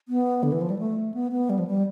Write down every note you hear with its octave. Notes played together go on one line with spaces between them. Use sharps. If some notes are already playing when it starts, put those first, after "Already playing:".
B3
D3
E3
F3
G3
A3
B3
B3
G3
F3
G3